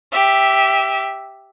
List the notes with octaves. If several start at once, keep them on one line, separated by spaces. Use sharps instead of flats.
G4 E5